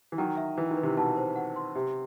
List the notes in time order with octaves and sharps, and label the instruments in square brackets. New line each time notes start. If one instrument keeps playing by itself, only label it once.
[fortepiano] E3
[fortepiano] D#3 F#3 [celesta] G5
[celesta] E5
[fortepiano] E3 [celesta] B4
[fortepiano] D#3
[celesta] B4
[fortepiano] C3 E3
[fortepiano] B2 [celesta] A5
[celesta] C5
F#5
C6
[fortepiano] C3 [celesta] G4